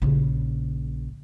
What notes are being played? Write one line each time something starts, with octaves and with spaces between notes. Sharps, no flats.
A#1 C#3